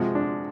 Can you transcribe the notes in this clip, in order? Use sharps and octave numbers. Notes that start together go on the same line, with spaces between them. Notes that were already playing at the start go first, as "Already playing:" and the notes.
Already playing: C3 F3 G#3 F#4
D4